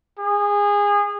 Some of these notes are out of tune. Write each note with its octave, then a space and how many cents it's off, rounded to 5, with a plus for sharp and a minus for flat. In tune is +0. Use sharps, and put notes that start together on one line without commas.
G#4 -25